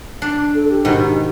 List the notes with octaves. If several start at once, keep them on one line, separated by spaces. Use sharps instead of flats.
D4
A4
G4
G#2 B2 D#3